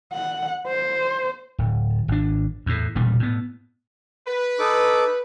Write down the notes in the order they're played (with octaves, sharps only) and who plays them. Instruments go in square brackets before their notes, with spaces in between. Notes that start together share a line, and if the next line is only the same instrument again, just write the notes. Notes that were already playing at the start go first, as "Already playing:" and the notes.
[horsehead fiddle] F#5
C5
[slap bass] D1
G#1 D4
E2 A2
E1 A#2 C#3 G3
A2 B3
[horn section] B4
[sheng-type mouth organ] D#4 A4 D6